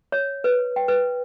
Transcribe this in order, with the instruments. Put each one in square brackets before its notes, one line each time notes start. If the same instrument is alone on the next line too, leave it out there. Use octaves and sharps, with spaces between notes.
[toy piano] C#5
B4
G5
B4